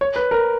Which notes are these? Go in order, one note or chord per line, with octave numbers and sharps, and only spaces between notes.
C#5
B4
A#4